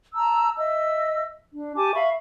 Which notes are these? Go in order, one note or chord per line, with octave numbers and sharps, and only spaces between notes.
A5 A#5 E6
D#5 E5 E6
D4
G4 G#5 A5 D6
E5 F5 B5 C#6